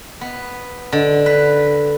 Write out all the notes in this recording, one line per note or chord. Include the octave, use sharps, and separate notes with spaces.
B3
D3
B4